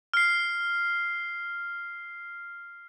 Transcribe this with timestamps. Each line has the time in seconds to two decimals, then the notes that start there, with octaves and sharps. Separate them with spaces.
0.14 F6 C7